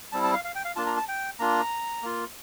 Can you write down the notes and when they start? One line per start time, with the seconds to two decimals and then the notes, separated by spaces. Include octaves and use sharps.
0.12 G3 C4 E4 A5
0.23 A5
0.34 F5
0.44 F5
0.55 G5
0.65 F5
0.76 A#3 D4 F4 A5
0.86 A#5
0.97 A5
1.08 G5
1.39 A#3 D4 F4 A#5
2.02 A#3 F4